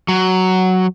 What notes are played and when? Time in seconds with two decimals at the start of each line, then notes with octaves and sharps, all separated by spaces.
0.08 F#3